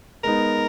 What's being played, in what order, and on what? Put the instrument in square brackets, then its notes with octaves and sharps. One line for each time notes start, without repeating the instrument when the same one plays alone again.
[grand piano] G#3 B3 D#4 [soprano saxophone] A#4